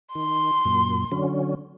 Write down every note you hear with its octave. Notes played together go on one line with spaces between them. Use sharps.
D#3 C6
F#2 A#2
D3 F#3 C#4